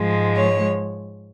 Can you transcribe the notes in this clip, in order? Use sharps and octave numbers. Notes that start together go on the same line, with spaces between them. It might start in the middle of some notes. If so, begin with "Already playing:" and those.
Already playing: G#2 F3 G#3
C#5